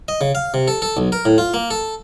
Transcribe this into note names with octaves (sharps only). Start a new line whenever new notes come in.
D#5
C#3
F5
C3
A4
A4
B1
A#4
A2
F4
A#3
A4